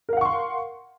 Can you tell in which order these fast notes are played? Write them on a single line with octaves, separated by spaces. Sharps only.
A#4 F5 F#5 C#6 C6